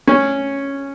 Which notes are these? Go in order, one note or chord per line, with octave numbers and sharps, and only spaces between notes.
C#4